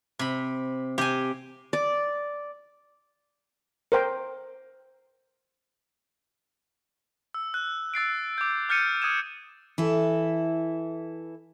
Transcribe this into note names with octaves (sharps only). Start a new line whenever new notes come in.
C3 B5
C3 G4 G#5
D5
A#4 C5 G5
E6
F#6
E6 A6 C7 D7
D6 G6
D6 F6 G6 A6 C#7 D#7
D#6 G#6 D#7 E7
E3 E4 A4